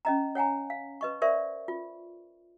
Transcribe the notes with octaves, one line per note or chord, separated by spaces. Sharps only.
C#4 D#5 A#5
C#5 F#5 G#5 A#5
F5
B4 D#5 C#6
A#4 C5 D5 E5 C#6
F4